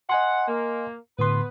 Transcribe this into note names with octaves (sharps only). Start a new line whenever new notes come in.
D#5 F#5 G#5 C6
A#3
A2 D3 B3 B4 C6